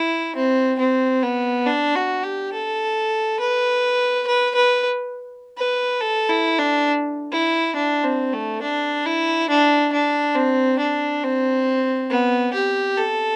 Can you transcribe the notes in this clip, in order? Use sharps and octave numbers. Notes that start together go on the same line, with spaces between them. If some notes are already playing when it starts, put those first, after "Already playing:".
Already playing: E4
C4
C4
B3
D4
F#4
G4
A4
B4
B4
B4
B4
A4
E4
D4
E4
D4
C4
A3
D4
E4
D4
D4
C4
D4
C4
B3
G4
A4